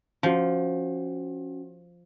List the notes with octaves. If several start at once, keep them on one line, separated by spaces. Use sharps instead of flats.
F3 C#4 F#4